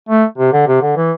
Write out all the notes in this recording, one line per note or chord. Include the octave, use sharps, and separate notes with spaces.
A3
C3
D3
C3
D3
E3